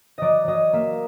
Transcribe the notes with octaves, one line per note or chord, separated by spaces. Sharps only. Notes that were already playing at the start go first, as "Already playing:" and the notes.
F#3 D5 D#5
F#3 D#5
A#3 E5